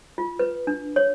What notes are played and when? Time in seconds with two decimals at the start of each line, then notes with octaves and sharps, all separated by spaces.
0.18 F4
0.39 B4
0.67 D4
0.96 C#5